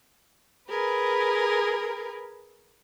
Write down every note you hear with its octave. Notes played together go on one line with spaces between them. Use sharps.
G#4 A#4 B4